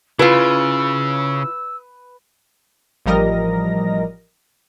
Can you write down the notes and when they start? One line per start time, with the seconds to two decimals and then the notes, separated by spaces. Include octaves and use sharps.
0.19 C#3 E4 F4 B4 E6
3.06 A1 F3 G3 A#4 D#5 A#6